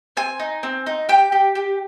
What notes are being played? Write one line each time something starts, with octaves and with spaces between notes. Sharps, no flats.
C4 G#5
D#4
C4
D#4
G4 G5
G4
G4